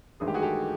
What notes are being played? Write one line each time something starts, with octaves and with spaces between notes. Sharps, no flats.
A1 G2 D#3 G#3 G#4
G4
F#4 G#4
G4 A4